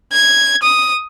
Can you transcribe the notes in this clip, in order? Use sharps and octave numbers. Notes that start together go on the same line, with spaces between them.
G#6
D#6